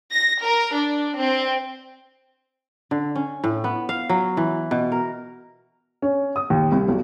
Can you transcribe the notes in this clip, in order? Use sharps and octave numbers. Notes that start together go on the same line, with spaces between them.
A#6
A#4
D4
C4
D3
C#4
A2
B3
F5
F#3
E3
B2
A#4
C#4
D#6
D#2
C2
B1